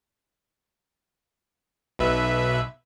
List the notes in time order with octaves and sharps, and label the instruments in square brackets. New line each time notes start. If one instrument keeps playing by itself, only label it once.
[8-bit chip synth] B1 B4 E5